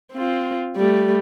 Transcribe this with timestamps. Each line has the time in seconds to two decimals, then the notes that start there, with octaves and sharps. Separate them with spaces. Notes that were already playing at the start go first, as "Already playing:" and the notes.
0.13 C4 F4
0.77 G3 A3